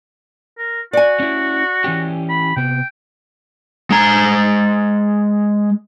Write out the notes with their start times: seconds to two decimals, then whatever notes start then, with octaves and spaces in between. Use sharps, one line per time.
0.58 A#4
0.93 F#4 D5 G#5
1.20 C#4 E4
1.84 E3 C#4 G4
2.30 B5
2.56 C3 B3 G5
3.90 G#3 A#5